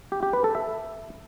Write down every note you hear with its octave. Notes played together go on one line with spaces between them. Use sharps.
G4
G4
B4
A4
E5